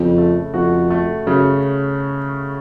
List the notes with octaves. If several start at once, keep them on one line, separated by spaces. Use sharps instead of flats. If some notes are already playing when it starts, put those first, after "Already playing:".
Already playing: F2 C#3
A3
F2 F#4
A3
F#2 C#3